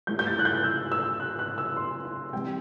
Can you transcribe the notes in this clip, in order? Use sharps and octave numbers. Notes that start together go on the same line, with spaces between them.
A2 G3 G6
G6
A6
F#6
G6
F#6
E6
E6
F#6
F#6
E6
C6
C6
C3 E3 G3 G5